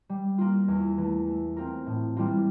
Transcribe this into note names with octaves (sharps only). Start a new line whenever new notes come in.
G3
A#3 F4
E2
E3 A3
A3
C4 F4 A#4
A2
E3 G3 A#3 F4